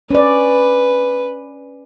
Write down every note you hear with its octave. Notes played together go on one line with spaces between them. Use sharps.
C#4 B4 D5